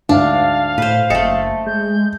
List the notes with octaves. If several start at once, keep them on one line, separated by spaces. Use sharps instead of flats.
D2 G#2 D4 F5
A2 B4 C5
F#1 A3 A4 D#5 G5
G#3 G6